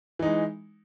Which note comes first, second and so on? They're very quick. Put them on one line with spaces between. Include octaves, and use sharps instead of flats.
E3 D#4 G#3